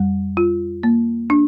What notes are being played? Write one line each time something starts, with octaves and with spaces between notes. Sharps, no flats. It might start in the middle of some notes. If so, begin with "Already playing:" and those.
Already playing: F2 G3
F4
A#3
D4